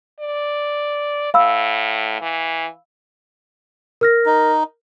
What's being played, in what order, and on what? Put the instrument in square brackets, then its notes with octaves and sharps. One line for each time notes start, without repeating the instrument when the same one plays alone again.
[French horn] D5
[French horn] A2 [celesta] F5 B5 E6
[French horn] E3
[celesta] A#4 F6 A#6
[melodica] D#4